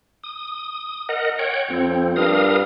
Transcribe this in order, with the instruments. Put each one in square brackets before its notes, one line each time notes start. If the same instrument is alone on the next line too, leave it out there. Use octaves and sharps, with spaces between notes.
[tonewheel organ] D#6
A#4 D#5 F#5
C#5 F#5 G5
[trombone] F2 [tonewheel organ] C4
[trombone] G2 [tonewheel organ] A#4 F5 D#6